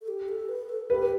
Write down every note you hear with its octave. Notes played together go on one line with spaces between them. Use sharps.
A4
G4
A4
B4
A4
G4 B4